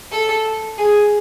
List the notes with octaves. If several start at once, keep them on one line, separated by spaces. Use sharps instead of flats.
A4
G#4